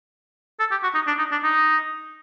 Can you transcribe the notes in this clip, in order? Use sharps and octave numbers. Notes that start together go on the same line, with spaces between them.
A4
G4
F#4
D#4
D4
D#4
D4
D#4